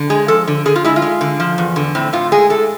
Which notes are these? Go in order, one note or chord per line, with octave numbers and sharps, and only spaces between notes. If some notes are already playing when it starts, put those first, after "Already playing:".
Already playing: D3
G#3 G#4
F3 A4
D3
D3 G#4
F4
G#3 E4
F4
G#3
D3
F3
E2
D3
A2 C4
A2 F4
G#3 G#4
A2 A4